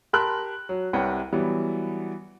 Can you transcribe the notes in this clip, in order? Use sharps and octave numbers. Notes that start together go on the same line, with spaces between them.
G4 A#4 A5 B5 C6 F#6
F#3
C2 C3 B4 C#5 F#5 G5
E3 F#3 G3 B3